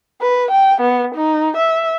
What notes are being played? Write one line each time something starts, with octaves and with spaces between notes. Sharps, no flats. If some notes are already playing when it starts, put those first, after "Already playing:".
B4
G5
B3
D#4
E5